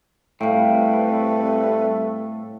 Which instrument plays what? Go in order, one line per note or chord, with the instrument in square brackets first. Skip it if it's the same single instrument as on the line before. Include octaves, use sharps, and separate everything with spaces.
[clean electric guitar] A2 [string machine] G3 C4 B4 [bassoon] A3 [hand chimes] F5 G5